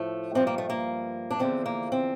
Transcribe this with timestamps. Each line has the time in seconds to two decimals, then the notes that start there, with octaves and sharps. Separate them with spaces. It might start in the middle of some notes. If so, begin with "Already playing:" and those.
Already playing: A2 F3 A3
0.35 G2 F3 C4
0.47 A#3
0.58 A3
0.70 A#3
1.31 D4
1.39 E2 D3 F3 C4
1.66 A#3
1.92 C4